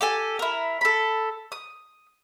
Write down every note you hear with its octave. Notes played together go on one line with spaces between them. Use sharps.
G4 A4 G#5
E4 A#4
A4 B5
D#6